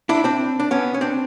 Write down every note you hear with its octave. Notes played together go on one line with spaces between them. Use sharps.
D4 E4
C4 D4
D4
B3 C#4
C#4
C4 D4